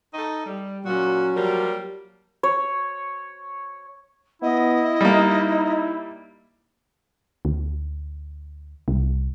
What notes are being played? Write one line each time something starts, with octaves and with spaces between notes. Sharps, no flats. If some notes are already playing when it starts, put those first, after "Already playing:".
D#4 A4 D#5
G3
A#2 F#3 C#4 F#4
F3 G3 A#3
C#5
B3 E4 D#5
G3 A#3 D#4
D2
C2